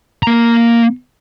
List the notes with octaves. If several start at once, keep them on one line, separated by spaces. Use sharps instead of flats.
A#3 A#5